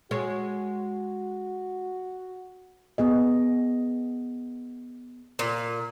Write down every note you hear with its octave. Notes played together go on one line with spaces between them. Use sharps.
G#3 F#4 C#5
B3 G#4 D#5
A#2